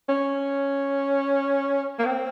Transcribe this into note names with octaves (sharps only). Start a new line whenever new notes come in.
C#4
A#3
C4